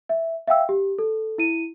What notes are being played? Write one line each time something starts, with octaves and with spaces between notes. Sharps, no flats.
E5
E5 F5 G5 E6
G4
A4
E4 D#7